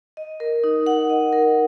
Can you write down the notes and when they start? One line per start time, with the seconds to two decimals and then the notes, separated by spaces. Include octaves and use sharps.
0.17 D#5
0.40 A#4
0.64 D#4
0.87 F#5
1.09 D#5
1.33 A#4